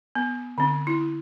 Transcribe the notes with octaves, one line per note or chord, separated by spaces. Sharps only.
B3
D3 C4
E4